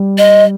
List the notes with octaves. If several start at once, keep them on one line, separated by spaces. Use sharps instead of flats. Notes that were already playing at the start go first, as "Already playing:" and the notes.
Already playing: G3
D#5